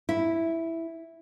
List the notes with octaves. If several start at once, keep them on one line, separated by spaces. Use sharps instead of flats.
E4